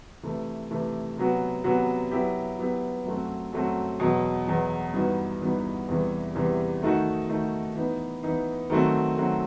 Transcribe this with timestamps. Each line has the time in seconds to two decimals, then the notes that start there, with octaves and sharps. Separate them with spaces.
0.23 C3 E3 A3
0.71 C3 E3 A3
1.17 C3 F#3 B3 F#4
1.64 C3 F#3 B3 F#4
2.11 F#3 B3 E4 G4
2.58 F#3 B3 E4 G4
3.05 F#2 F#3 A3 C4 F#4
3.52 F#2 F#3 A3 C4 F#4
4.00 E2 B2 F#3
4.47 E2 B2 F#3
4.94 G2 E3 B3 D#4 F#4
5.41 G2 E3 B3 D#4 F#4
5.88 E2 C3 E3 G3
6.35 E2 C3 E3 G3
6.82 D#3 A3 D#4 F#4
7.29 D#3 A3 D#4 F#4
7.75 E3 B3 D#4
8.23 E3 B3 D#4
8.70 D#3 F#3 A3 C4 F#4
9.17 D#3 F#3 A3 C4 F#4